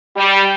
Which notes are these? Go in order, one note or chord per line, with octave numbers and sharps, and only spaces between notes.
G3